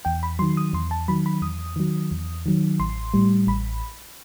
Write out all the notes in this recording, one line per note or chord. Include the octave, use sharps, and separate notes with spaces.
E2 G5
B5
D#3 F#3 C6
D#6
E2 C6
A5
D#3 F#3 B5
B5
E2 D#6
D#3 F#3
E2
D#3 F#3
A1 C6
A2 G3
A1 B5